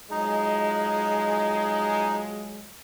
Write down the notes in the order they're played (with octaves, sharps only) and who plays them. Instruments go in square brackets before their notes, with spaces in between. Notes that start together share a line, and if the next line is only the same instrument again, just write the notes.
[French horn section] F3 F#3 G#3 [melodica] D#4